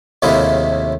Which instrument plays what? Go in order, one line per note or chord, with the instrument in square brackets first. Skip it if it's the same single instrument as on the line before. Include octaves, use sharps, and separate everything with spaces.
[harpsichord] D#2 A2 C3 G#3 A#3 E4